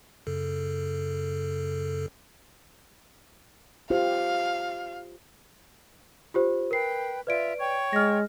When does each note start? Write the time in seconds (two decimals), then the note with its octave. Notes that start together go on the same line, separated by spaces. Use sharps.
0.27 F#2 C#3 A4
3.90 F4 G4 C5 F5
6.34 F4 G4 C5
6.71 A#4 B4 G5 C7
7.27 F4 B4 D5 E5 D7
7.60 C#5 G5 C#6
7.93 G#3 F6 A#6